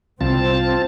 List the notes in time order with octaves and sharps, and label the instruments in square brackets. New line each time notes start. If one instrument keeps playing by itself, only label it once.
[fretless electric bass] C2 [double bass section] C4 [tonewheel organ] F4 A5